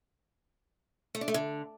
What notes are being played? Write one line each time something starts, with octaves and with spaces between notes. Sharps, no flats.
A3
D4
A3
D3